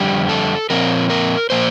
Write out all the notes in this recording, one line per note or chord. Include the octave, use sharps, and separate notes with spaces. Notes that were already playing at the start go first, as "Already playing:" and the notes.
Already playing: F2 D3 G3 G4
A4
A#2 F3 C4 A#4
A#4
A#2 F3 A#3 C5